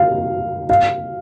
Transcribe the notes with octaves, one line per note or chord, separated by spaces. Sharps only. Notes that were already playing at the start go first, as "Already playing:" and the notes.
Already playing: F5
F5